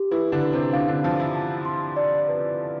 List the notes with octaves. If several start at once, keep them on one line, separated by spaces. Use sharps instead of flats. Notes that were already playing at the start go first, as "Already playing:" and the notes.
Already playing: G4
E3 E4 B4
D3 D4
B4
C3 C4
D3 D4 F5
D3 D4
F3 F4 A5
E3 E4
A5
C6
D5
B4